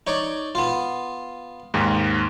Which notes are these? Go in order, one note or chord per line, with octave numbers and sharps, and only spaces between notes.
D#4 C#5 D5
B3 F4
D#2 G#2